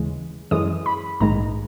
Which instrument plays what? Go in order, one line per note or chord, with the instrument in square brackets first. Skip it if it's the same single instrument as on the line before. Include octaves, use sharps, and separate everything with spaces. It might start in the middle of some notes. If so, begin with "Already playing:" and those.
Already playing: [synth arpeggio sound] D#2 C#3 E3 G#3
F#2 E3 G#3 D#6
B5
A#1 G#2 D#3 G#3 A#5